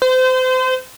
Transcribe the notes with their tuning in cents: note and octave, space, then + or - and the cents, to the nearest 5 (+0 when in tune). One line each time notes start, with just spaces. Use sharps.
C5 -30